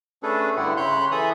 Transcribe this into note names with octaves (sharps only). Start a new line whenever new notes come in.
A3 C#4 D4 G#4 A4 B4
G2 D3 E4 G4 F#5
C#3 C#5 B5 C6 F#6 G6
E3 G#4 A4 E5 B5 D#6